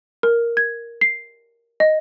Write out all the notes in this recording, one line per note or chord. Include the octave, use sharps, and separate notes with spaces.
A#4
G#6
C7
D#5